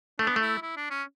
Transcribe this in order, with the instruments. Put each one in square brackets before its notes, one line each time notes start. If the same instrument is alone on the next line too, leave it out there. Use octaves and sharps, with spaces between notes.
[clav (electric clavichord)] A3 [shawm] D4
[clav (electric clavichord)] B3
[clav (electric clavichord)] A3 [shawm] E4
[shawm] E4
D4
C#4